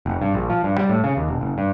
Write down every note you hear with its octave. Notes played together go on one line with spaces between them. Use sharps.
F1
G2
A#1
F3
G2
G3
A2
C#3
D#2
E1
F#1
G2